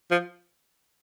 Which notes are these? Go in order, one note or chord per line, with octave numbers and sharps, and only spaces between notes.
F3